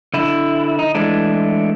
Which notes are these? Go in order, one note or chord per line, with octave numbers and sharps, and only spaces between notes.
D3 E4
D#4
E3 G#3 A3 D4